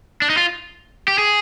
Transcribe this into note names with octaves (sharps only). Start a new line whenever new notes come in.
D4
D#4
F4
G4
G#4